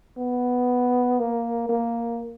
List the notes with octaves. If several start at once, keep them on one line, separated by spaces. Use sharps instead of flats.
B3
A#3
A#3